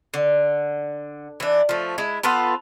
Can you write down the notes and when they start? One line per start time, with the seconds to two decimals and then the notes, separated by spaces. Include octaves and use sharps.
0.14 D3
1.40 E3 D4
1.69 F3 A3
1.98 G#3 E4
2.23 B3 F4 A4 B4